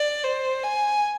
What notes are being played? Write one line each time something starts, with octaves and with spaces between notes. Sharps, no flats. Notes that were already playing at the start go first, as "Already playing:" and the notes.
Already playing: D5
C5
G#5